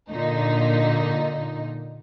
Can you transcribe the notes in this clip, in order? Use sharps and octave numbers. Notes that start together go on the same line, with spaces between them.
A#2 D3 D#4